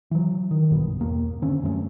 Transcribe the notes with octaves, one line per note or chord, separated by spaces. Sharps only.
E3 F#3
D#3
B1 G2 B2 B3
E2 A#3
D3 C4 C#4
F#2 A3 A#3 C#4